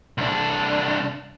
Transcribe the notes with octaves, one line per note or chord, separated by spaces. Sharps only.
C2 D4